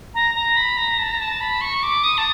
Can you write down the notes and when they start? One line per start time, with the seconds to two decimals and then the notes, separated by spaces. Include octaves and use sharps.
0.14 A#5
0.35 A#5
0.56 B5
0.77 A#5
0.99 A5
1.11 A#5
1.20 A5
1.41 B5
1.61 C#6
1.83 D6
2.04 D#6
2.18 A5